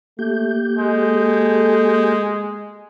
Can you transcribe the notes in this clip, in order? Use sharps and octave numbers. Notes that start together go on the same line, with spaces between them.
A3 A#3 G4 G6
G#3 A4